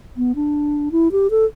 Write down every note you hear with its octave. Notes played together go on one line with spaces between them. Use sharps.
B3
D4
E4
G4
A4